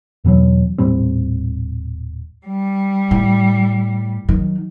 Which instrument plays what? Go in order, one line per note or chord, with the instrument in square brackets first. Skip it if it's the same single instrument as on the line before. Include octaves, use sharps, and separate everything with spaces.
[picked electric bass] E2 B2 E3 F#3
D#1 A2 G3 C4
[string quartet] G3
[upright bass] A2
D#3 F#3